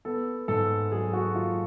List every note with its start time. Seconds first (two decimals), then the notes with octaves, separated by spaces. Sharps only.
0.05 B3 A4
0.48 G#2 A4
0.92 F#3 G#4
1.13 F#4
1.35 F#3 F4